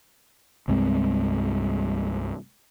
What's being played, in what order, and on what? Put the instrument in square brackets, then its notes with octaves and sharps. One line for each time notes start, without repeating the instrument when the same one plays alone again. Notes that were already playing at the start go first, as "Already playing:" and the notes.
[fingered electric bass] C2 G2 G#3 C4